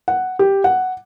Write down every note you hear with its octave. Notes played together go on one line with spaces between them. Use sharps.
F#5
G4
F#5